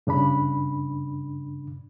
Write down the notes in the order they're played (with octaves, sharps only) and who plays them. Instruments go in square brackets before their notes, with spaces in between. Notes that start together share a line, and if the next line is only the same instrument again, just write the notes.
[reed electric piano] G2 C#3 D4 B5